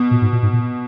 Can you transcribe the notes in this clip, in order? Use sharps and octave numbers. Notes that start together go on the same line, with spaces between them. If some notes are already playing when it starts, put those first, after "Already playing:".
Already playing: B2
A#2
G#2
A#2
G#2
A#2